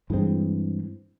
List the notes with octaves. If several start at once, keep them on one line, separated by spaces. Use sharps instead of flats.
G2 E3 G#3 C4